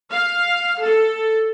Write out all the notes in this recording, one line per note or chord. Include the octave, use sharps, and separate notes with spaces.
F5
A4